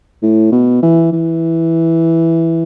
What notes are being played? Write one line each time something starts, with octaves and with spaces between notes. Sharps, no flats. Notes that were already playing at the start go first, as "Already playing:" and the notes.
A2
B2
E3
E3